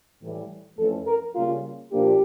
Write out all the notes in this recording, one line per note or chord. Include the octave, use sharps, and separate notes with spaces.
A2 E3 G3
F2 E3 A3 C#4 A4
A#4
C#3 G3 A#3 C#4 F4
A#2 F3 A#3 D4 G4